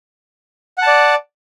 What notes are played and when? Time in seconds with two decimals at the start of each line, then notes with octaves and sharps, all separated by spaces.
0.78 F#5
0.82 A5
0.87 D5